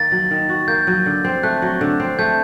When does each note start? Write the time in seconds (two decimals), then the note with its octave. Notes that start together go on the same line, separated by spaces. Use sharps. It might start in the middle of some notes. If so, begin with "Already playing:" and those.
Already playing: D#3 A#3 A6
0.12 F#3
0.31 D#3
0.49 F#4
0.68 A#3 G6
0.87 F#3
1.06 D3
1.25 C4
1.43 A3 F#6
1.62 F#3
1.81 D3
2.00 C4
2.19 A3 G6